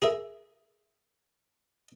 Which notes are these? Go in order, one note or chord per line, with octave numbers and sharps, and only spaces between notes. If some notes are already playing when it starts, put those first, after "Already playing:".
G#4 A#4 E5